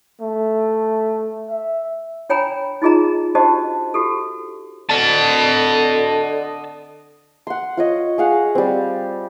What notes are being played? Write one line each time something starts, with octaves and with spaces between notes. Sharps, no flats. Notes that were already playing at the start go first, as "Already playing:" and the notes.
A3
E5
D4 C#5 G5 G#5 A#5 B5
D#4 F4 G#4 D#5 A#5
D4 F#4 G4 C5 D#5 A5
F#4 G4 A4
D3 D#5 A5
F#5 C6
F4 C#5 D#5
G#4 F5 F#5
G3 C4